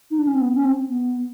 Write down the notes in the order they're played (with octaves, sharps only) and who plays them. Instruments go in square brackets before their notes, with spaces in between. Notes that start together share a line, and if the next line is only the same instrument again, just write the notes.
[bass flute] D#4
D4
C#4
C4
B3
C#4
C4
B3